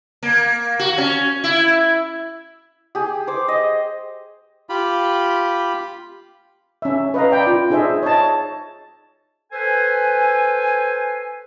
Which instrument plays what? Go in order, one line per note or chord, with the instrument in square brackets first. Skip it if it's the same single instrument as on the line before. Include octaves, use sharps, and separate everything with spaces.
[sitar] A#3
F#4
C#4
E4
[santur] G4 G#4
C5 D6
D#5
[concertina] F4 G4 B5
[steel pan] C#4 E5
B4 D#5 F5 A#5
D5 G5 B5
F4
D4 D#4 G#4 C5 D#5 E5
C#5 D#5 A5
[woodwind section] A4 B4 C5 G#5